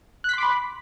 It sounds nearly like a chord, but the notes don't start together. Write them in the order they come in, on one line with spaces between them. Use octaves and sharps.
F#6 B6 C6 D6 B5